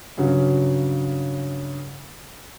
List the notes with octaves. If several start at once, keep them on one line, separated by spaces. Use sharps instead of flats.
G2 C#3 F#3 F#4